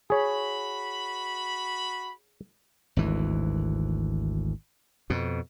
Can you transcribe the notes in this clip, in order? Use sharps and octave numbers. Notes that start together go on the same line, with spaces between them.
F#4 G#4 C#5 B5
G#1 D2 E3
F2 B2